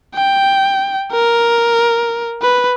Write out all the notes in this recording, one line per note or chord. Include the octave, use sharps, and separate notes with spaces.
G5
A#4
B4